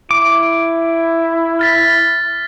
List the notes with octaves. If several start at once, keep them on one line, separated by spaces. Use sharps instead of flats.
E4 D6
F6 A6 B6